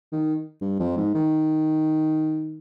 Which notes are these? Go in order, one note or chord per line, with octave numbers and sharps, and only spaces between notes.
D#3
G2
F2
G#2
D#3